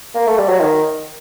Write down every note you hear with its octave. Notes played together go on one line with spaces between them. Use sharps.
A#3
A3
G3
F#3
D#3